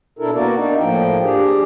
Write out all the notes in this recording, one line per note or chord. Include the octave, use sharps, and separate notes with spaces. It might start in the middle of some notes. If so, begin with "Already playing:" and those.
B2 D4 E4 A4 A#4
A#3 B3 F#4 A#4 D5
D4 D#4
A2 F3 A#3 G5
D4 G4 G#4